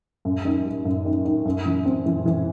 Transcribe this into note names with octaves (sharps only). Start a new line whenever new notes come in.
F#2
D#3
G3
F#2
D#3
D#3
F#2
E3
C4
E3
E3